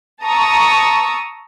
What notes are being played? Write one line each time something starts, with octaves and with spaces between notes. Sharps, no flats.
A5 A#5 C#6 D#6 E6